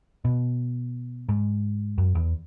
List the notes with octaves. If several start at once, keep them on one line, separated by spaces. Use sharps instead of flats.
B2
G#2
F#2
E2